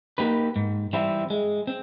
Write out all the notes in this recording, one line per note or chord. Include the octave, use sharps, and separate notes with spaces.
A#3 D#4 G4 B4
G#2
E3 G3 C4 E4
G#3
C4